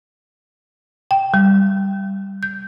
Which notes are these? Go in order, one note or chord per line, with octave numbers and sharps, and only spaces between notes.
G5
G3
G6